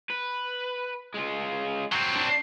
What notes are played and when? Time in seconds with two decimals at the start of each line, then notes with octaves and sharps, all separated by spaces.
0.10 B4
1.14 G#3 F4
1.93 F#3 C4
2.16 D4